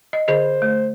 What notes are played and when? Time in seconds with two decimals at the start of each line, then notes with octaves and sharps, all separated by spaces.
0.13 D#5
0.28 D3 G#4 C5 D#5
0.62 A3